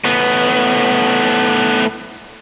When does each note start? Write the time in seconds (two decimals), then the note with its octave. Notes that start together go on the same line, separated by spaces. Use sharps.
0.04 A2 B3